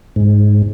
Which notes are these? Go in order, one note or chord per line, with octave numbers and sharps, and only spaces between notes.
G#2